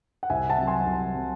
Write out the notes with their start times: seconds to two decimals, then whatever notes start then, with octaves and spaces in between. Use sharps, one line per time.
0.23 F#5
0.30 C2 E5 G#5
0.49 F#5 A5
0.58 C3 F#3
0.67 G#5 C6
0.86 C2
1.15 C3 F#3